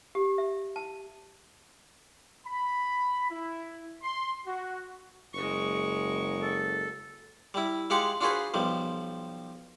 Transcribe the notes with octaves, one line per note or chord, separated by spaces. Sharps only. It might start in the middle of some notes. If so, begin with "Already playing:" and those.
G4
E5
A5
B5
E4
C6
F#4
F#1 G#3 C#6
A4
G3 E4
G#3 F4 G4 F#5 D6
D4 F4 F#4 G#4 B4 C5
B1 F3 G3